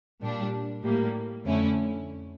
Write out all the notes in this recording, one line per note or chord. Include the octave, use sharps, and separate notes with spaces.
A#2 G3 D4
A2 G3 A#3
F2 D3 A3 C#4 E4